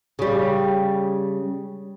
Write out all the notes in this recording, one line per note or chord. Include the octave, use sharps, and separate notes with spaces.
C#3 G3